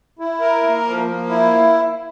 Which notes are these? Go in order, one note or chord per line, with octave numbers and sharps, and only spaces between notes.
E4
A#4
A#3
F3
A#3
E4